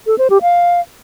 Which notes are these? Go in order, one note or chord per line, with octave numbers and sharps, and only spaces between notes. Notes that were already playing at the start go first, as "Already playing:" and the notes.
A4
C5
G4
F5